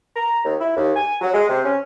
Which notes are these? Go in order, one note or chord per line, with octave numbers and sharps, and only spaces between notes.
A#5
D#2
E4
D#2
G#5
F#3
G#3
C3
C#4